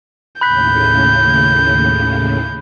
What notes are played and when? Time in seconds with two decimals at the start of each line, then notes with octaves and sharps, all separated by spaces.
0.41 D#2 A2 C#3 B5 F#6 G6 B6